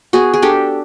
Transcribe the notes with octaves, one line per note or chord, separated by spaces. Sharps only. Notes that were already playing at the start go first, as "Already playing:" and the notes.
B3 F#4 G#4
G#4
D4 G4 A4